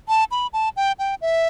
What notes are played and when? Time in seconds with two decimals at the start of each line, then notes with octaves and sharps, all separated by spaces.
0.08 A5
0.31 B5
0.53 A5
0.76 G5
0.99 G5
1.22 E5